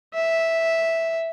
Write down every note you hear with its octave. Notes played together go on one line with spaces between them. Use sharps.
E5